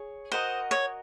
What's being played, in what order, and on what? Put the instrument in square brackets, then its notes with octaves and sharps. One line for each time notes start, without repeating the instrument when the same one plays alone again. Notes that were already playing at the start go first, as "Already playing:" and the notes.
Already playing: [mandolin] G#4 C#5
[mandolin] F#4 A#4 D#5 F#5 [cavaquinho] C5
[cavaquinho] C#5